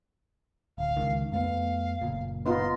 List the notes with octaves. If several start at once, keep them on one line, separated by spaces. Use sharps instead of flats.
D1 F5
C#2 D#3
F2 A3 B3 F5
F#1 A#2
B3 D#4 F4 C6